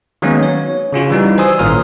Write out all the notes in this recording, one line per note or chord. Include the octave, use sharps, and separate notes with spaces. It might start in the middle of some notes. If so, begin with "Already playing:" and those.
D#3 F#3 G#3 A#3 B3 C#4
C#5
C#3 C#4 F4 F#4
E3 G3 D#4
C5 G#5 C6 D#6 E6
G#1 A#2 C#5 C6 D#6 F6